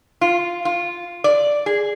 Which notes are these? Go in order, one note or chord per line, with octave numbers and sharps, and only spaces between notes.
F4
F4
D5
G#4